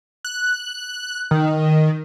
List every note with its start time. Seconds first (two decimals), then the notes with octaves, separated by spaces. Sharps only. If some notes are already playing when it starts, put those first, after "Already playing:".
0.25 F#6
1.31 D#3